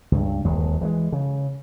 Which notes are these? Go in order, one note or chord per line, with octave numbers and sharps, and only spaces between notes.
C#2 G2
D#1 D#2 F#3 G#3
E3 F3 G#3
C#3